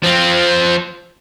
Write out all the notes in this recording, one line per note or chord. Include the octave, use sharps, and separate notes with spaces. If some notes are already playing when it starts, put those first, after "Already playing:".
F3 C4